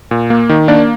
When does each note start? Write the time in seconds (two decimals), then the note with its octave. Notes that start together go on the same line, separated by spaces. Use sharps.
0.11 A#2
0.30 A#3
0.49 D#3
0.68 A#3 D4 D5